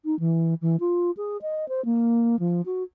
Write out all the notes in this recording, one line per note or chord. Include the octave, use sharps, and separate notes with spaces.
D#4
E3
E3
F4
G#4
D#5
C5
A#3
F3
F#4